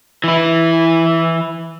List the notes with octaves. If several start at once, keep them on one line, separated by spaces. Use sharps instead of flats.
E3 E4